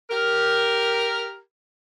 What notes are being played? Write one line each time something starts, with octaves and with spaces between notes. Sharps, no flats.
G4 A#4